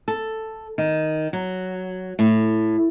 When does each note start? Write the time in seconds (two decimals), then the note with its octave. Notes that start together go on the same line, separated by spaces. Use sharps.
0.08 A4
0.78 D#3
1.33 F#3
2.19 A2